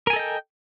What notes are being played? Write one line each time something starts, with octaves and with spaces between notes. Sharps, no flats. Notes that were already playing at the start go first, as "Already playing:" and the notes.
A4 A#4 D#5 G5 G#5